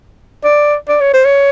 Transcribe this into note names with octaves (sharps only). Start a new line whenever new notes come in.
D5
D5
C#5
C5
C#5